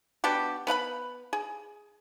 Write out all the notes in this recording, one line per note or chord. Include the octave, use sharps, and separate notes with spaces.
B3 D4 F#4 G4
B3 B4 F5 B5
G#4